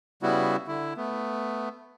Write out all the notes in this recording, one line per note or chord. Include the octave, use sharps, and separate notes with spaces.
C#3 G3 B3 E4 F#4
D3 E4
A3 B3